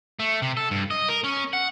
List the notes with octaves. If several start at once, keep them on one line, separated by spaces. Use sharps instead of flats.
A3
C3
A4
G2
D#5
A#4
C#4
F#5